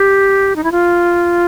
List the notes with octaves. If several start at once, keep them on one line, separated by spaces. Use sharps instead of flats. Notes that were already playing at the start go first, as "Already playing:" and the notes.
Already playing: G4
D#4
E4
F4